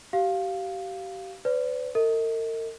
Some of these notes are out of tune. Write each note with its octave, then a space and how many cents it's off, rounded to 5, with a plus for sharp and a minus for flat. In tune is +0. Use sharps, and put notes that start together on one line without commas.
G4 -35 F5 +0
B4 +30 D5 -35
A#4 -45 D#5 +35